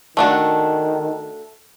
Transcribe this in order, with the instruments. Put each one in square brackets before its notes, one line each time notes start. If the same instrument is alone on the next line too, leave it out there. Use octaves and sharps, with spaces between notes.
[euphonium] D#3 [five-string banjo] A3 D4 F#4